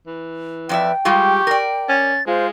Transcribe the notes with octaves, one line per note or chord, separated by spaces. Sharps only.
E3
F2 B4 D5 E5 G5
G3 G#3 F4 G4 C#6
A#4 D5
C#4 A6
G#3 F4 C5